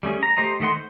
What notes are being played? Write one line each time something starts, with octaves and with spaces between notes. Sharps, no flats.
G3 A3 C#4 G#4
A#5
A3 G4 C5 D#5 A#5
D#3 A3 D#5 F#5 C6
C5